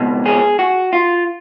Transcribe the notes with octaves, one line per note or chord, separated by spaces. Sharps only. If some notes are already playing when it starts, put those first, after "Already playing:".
Already playing: C#2 B2
G#4
F#4
F4